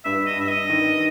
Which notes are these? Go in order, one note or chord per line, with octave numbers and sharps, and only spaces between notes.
G2 E5
D#5
G2 E5
D#5
D#3